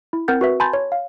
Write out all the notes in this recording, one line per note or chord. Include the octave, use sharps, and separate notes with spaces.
E4
C4 A#4 F#5 G6 A6
F#4 B4 E5
G#5 A5 B5 C6 G6 A6
C#5
F5